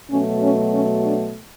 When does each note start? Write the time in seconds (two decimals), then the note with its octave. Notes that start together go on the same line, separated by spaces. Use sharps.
0.10 B2 F#3 A3 C#4
0.42 C#4
0.73 C#4
1.05 D4